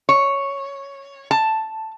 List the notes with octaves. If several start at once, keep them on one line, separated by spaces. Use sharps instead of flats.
C#5
A5